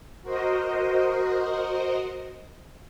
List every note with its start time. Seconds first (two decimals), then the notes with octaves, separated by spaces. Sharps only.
0.22 F#4 A#4 C5 D#5